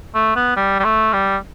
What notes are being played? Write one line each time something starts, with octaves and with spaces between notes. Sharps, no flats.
A3
B3
G3
G3
A3
G3